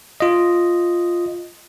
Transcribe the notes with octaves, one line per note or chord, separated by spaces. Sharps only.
F4 D#5